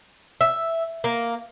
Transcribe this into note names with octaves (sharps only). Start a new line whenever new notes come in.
E5
A#3